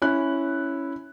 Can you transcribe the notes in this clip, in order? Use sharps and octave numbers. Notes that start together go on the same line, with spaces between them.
C#4 E4 F#6